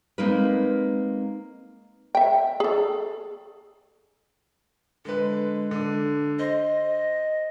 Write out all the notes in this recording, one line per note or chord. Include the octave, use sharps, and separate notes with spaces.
G#3 A#3 C4 D#4 A#4 B4
E5 G5
G#4 A4
D3 G#3 B4
D3
C5 D#5